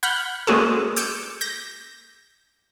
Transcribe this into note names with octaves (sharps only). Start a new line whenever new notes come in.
F#5 B5 F6 G6
G#3 A#3 C#4 F#4 G#4 A4
D6 E6 G6 C#7 D7 E7
G6 A#6